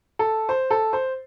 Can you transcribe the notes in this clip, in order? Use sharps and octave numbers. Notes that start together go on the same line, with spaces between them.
A4
C5
A4
C5